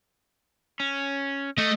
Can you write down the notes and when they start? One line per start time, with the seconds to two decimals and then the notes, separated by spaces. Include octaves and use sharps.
0.80 C#4
1.58 A3 D#5